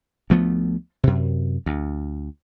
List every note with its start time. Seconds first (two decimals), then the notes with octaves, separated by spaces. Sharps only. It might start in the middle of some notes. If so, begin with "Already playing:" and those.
0.30 D2 F3 A3 B3
1.03 F#2 C3
1.66 D2